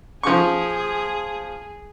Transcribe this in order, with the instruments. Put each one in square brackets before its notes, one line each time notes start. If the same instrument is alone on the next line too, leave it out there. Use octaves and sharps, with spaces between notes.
[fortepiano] F3 C#6 [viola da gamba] G#4